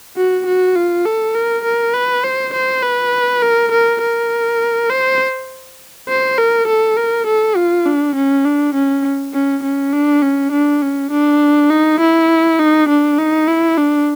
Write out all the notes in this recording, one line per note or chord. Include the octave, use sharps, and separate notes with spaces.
F#4
F#4
F4
A4
A#4
A#4
B4
C5
C5
B4
A#4
A#4
A#4
C5
C5
A#4
A4
A#4
A4
F4
D4
C#4
D4
C#4
C#4
C#4
D4
C#4
D4
C#4
D4
D#4
E4
D#4
D4
D#4
E4
D4